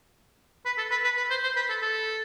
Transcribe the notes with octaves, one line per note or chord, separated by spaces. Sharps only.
B4
A4
B4
B4
B4
C5
C5
B4
A4
A4